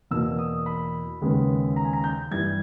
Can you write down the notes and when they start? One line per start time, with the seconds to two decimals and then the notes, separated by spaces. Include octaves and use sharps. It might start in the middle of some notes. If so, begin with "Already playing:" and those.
0.11 E2 B2 A#3 E6
0.38 D#6
0.66 B5
1.21 D#2 C#3 G#3 B3
1.76 A#5
1.85 G#5
1.93 A#5
2.04 G6
2.31 G2 E3 G3 G#6